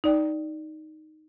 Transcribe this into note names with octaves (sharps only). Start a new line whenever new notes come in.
D#4 D5 G5